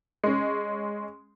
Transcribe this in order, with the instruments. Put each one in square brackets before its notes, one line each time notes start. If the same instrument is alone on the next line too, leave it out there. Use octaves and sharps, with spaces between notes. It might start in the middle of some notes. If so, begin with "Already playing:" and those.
[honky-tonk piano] G#3 C#4